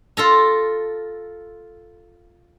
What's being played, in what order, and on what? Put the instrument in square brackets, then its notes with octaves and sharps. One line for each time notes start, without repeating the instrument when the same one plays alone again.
[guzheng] F4 A4 A#5